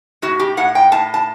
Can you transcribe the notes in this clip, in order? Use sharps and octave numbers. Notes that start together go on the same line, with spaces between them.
A2 F#4
G4
A2 F#5
G5
A2 A5
A5